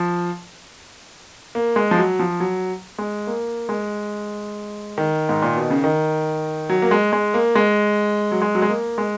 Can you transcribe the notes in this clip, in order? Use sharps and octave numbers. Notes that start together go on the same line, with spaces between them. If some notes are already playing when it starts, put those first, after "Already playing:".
Already playing: F3
A#3
G#3
F3
F#3
F3
F#3
G#3
A#3
G#3
D#3
G#2
A#2
B2
C#3
D#3
F#3
A#3
G#3
G#3
A#3
G#3
F#3
G#3
F#3
G#3
A#3
G#3